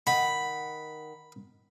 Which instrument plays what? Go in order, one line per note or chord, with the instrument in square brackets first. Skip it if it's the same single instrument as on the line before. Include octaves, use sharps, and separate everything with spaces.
[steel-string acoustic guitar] D#3 F#5 [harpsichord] B5